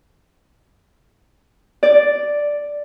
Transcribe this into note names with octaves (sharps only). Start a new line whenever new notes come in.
D5